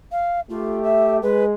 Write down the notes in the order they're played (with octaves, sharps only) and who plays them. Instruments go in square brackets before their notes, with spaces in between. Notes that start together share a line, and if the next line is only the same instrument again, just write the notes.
[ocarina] F5
[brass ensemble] A3 G4 [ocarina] F4
[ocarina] E5
[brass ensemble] G#3 [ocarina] B4